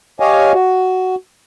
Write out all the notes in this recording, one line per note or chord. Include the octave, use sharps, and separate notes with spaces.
G4 C#5 D#5 F5 G#5
F#4